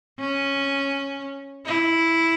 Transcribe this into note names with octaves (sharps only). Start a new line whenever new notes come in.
C#4
E4